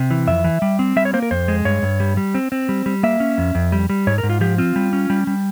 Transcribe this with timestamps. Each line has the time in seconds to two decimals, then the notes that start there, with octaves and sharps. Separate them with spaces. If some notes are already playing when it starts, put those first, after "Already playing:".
Already playing: C3
0.11 E3
0.27 F2 E5
0.44 E3
0.62 G3
0.79 C4
0.96 G3 E5
1.05 C#5
1.13 A#3 C5
1.22 A#4
1.31 F2 C5
1.48 G#3
1.65 G2 C#5
1.82 G2
2.00 G3
2.17 G3
2.35 C4
2.52 C4
2.69 G3
2.86 G3
3.03 A#3 E5
3.20 C#4
3.38 F2
3.55 F2
3.72 G3
3.90 G3
4.07 G#2 C#5
4.18 A#4
4.23 G#2
4.30 F4
4.41 F3 G4
4.58 C4 F4
4.76 G3
4.93 C#4
5.10 G3
5.27 G3